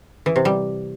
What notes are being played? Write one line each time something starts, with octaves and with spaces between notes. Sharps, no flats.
E3
C3
G3